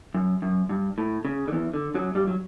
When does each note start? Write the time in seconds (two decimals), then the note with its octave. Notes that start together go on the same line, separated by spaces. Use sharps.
0.14 F#2
0.42 F#2
0.69 G2
0.98 A2
1.25 C#3
1.48 D3
1.52 E2 E3
1.74 D3
1.94 F#2 F#3
2.15 G2 G3
2.27 F#3